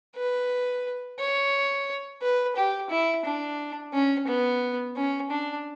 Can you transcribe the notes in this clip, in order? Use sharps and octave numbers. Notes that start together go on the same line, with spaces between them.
B4
C#5
B4
G4
E4
D4
C#4
B3
C#4
D4